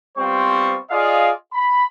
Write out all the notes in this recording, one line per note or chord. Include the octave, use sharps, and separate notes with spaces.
G3 B3 C4 F4 C5 C#6
F4 G#4 D5 D#5 F5
B5